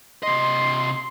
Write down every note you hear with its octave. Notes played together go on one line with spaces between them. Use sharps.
C3 D#5 C6